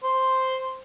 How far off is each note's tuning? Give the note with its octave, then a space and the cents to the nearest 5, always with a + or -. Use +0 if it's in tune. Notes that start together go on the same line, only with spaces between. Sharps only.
C5 +0